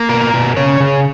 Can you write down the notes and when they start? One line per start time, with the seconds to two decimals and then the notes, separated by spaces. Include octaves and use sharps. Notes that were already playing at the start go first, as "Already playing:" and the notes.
Already playing: A#3
0.09 B2 A#4
0.34 B2
0.57 C#3 C#5
0.80 C#3